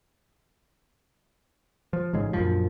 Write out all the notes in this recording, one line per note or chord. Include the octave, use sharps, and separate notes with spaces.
F3
A1 G#2 C#3 G#3
A#1 F#2 F3